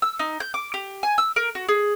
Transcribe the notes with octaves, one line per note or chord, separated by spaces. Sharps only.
E6
D#4
G6
D6
G4
G#5
E6
A#4
F#4
G#4